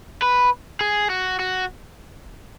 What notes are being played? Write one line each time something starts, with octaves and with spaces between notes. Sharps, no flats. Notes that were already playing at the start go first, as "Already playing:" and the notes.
B4
G#4
F#4
F#4